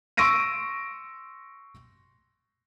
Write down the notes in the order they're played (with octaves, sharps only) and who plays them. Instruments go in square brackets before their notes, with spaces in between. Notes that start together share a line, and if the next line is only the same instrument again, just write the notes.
[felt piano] C6 C#6 E6 A#6 D7 D#7